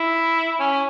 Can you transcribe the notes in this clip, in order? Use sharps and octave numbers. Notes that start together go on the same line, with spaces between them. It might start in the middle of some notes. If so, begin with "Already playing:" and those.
Already playing: E4
C#4